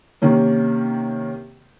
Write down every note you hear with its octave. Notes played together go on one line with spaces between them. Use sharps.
C3 D#3 A#3 C#4